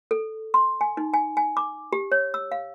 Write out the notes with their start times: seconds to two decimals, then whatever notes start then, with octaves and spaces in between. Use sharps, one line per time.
0.11 A4
0.54 C6
0.81 G#5
0.97 D#4
1.14 G#5
1.37 G#5
1.57 D6
1.93 G4
2.12 C#5
2.34 E6
2.52 F5